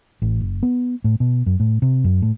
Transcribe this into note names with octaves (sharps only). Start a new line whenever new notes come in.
A1
F#1
B3
A2
B2
F#2
A2
C3
F#2
A2